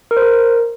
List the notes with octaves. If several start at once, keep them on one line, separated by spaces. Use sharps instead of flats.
A#4
C5
A#4